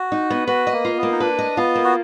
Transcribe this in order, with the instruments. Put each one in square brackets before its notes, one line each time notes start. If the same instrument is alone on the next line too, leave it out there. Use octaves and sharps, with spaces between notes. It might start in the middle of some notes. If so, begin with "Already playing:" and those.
Already playing: [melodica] F#4
[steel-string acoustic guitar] D#4
B3
[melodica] F#4 [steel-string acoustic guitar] B4
[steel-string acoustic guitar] D#5
[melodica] A#3
[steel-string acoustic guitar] F4
[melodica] B3
[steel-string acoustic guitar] A#3
[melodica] D#4
[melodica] D4 [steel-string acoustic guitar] B4
[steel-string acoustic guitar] D#5
[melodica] B3 [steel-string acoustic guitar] F4
[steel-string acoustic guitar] A#3
[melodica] F#4